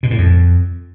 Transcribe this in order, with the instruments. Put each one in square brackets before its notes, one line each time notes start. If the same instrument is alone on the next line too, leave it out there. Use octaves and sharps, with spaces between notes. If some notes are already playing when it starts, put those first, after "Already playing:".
[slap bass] B2
A2
F2